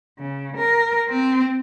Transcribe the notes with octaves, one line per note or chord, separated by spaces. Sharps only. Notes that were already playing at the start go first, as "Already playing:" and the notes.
C#3
A#4
C4